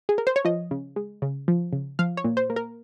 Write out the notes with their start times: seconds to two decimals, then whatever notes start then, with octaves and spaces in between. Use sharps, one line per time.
0.09 G#4
0.18 A#4
0.27 C5
0.36 C#5
0.45 F3 D#5
0.71 C#3
0.96 G#3
1.22 C#3
1.48 F3
1.73 C#3
1.99 F3 F5
2.17 C#5
2.24 A#2
2.37 C5
2.50 A#3
2.56 A#4